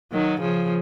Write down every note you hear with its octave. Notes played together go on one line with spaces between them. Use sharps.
D#3 F#3
C#3 F3